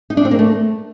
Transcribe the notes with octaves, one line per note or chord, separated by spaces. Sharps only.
D#4
D4
C4
A#3
A3